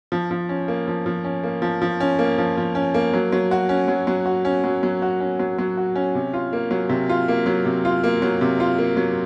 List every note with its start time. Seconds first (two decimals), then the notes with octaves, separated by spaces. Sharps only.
0.12 F3
0.31 F3
0.49 C#4
0.68 A#3
0.88 F3
1.06 F3
1.24 C#4
1.43 A#3
1.62 F3
1.82 F3
2.00 C#4
2.19 A#3
2.38 F3
2.57 F3
2.75 C#4
2.94 A#3
3.13 F#3
3.32 F#3
3.51 F#4
3.69 C#4
3.88 F#3
4.07 F#3
4.26 F#4
4.45 C#4
4.64 F#3
4.83 F#3
5.02 F#4
5.20 C#4
5.39 F#3
5.58 F#3
5.77 F#4
5.95 C#4
6.15 C3
6.33 F4
6.53 A#3
6.71 F#3
6.89 C3
7.09 F4
7.28 A#3
7.46 F#3
7.65 C3
7.85 F4
8.03 A#3
8.22 F#3
8.41 C3
8.60 F4
8.78 A#3
8.97 F#3